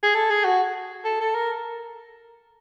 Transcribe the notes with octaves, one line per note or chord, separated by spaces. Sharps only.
G#4
A4
G#4
F#4
A4
A4
A#4